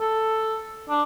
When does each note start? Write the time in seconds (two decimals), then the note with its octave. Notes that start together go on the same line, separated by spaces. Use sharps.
0.01 A4
0.89 D4